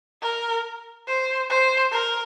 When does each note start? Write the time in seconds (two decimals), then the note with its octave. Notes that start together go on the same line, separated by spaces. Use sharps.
0.22 A#4
1.07 C5
1.50 C5
1.92 A#4